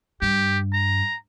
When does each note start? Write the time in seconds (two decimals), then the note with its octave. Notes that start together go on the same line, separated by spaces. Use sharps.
0.22 G2 G4
0.73 A#5